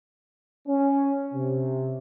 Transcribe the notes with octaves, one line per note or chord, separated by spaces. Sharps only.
C#4
C3